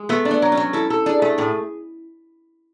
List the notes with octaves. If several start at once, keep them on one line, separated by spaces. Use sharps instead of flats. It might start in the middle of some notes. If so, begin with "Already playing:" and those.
Already playing: G#3
A3 B3
D4
B3
F#3
C#4
F#3
E4 A4
A4
D4 G#4
A3
A2 G#4